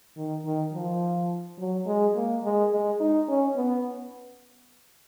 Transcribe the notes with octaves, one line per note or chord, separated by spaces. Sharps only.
D#3
D#3
F3
F#3
G#3
A#3
G#3
G#3
D#4
C#4
B3